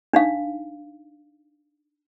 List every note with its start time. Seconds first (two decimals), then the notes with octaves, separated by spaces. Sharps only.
0.13 D4 D#4 F5